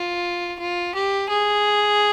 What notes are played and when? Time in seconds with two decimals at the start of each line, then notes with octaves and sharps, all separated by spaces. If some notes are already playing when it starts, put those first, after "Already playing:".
Already playing: F4
0.59 F4
0.94 G4
1.29 G#4